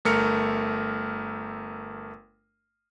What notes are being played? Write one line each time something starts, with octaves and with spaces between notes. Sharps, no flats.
G1 A3 A#4 F6 C#7